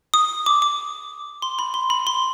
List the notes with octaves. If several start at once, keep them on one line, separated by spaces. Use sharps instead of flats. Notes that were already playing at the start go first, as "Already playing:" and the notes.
D#6
D6
D6
C6
B5
C6
B5
C6